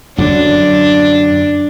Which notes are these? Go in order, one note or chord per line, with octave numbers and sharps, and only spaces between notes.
F#2 D3 F#3 D4